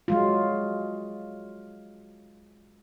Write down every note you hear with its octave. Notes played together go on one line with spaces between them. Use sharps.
F#3 G#3 F4